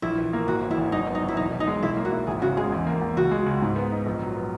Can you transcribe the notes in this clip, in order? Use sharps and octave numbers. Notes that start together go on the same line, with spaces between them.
A#1 E4
E3
A#3
G#1 F#4
E3
E4
G#1
F#2 D#4
B3
D#4
F#2
E4
E1 D#4
B2
D#4
G#3
B1 E4
A#3
F#4
E4
G#1 G#4
C#3 F#4
G#3 G#4
E2
A#3
E2
C#2 F#4
G#3
C#2
G#2
B3
D#4
A#1
F#3
B3